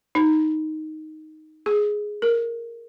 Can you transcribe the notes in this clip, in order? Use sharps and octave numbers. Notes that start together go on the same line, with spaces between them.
D#4
G#4
A#4